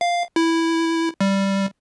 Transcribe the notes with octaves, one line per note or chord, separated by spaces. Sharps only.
F5
E4
G3